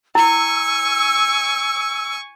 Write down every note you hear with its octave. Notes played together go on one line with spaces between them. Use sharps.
E4 G#5 C#6 E6